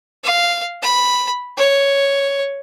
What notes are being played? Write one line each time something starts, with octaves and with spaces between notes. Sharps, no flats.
F5
B5
C#5